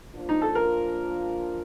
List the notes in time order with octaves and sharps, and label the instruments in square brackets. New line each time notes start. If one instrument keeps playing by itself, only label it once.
[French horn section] F3 A#3 D4 F4
[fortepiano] D#4
A4
A#4